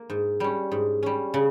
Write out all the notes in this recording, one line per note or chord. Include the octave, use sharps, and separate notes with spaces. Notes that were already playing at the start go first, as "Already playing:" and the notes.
Already playing: A#3
G#2
G3 C#4
G#2
G3 C#4
C#3